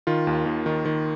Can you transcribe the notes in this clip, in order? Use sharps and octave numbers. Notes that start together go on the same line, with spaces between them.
D#3 F4
D#2
D#2
D#3
D#3